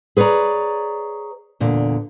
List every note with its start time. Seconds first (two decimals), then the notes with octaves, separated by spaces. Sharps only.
0.17 G#4 B4 C#5 D5 A#5
1.60 E2 A#2 D3